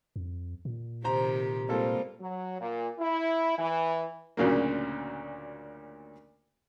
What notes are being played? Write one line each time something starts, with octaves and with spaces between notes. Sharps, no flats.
F2
A#2
C3 D#3 G4 C5 A#5
G3 G#3 A#3 C4 F4 A4
F#3
A#2
E4
E3
D2 A#2 C#3 F#3 A#3